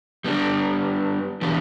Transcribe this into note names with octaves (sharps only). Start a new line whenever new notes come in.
G3 B3 D4
E3 B3 D4 G4